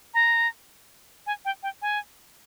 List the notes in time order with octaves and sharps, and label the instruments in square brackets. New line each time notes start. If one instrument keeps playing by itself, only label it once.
[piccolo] A#5
G#5
G5
G5
G#5